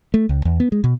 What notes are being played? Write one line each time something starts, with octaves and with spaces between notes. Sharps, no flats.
A3
C#2
E2
B3
G#3
B2